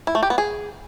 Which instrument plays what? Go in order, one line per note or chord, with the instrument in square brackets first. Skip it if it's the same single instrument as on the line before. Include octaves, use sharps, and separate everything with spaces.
[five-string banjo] E4
A3
G4
B3
G#4